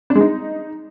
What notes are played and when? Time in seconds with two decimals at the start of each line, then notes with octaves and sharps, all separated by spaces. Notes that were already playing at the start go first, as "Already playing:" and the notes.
0.10 D4
0.15 G#3
0.21 D#4